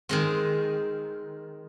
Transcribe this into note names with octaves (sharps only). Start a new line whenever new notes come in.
D#3 G#3 C4